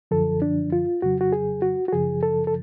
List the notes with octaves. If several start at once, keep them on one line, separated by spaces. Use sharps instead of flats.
F#2 D3 F3 A4
D4
F4
F2 C#3 F#3 F#4
F#4
G#4
F#4
F#4
F#2 C#3 F3 G#4
A4
A4